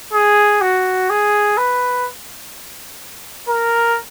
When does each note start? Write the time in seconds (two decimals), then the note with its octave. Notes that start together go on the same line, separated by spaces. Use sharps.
0.13 G#4
0.61 F#4
1.10 G#4
1.57 B4
3.48 A#4